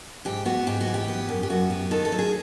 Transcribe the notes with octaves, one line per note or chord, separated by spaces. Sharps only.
G#2 G4
B3 F#4
G#2 G4
F#4
E3
G4
B3
F#2
G4
F#2 F#4
B3 G4
D#3 A4
A4
F#3
G#4